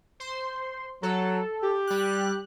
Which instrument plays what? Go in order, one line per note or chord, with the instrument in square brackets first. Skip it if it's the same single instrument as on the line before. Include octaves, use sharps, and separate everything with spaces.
[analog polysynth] C5 C6
[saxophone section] F#3 [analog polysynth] A4
[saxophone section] G4
[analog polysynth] G3 F#6